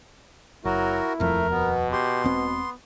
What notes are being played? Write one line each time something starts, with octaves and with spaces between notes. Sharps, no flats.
F#1 F#3 E4 F#4 A#4
D#1 F2 F3 A3 A#4
B2 B3
G4 C6
E1 B3 C4